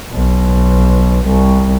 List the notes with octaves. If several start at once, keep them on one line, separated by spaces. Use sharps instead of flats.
B1
C2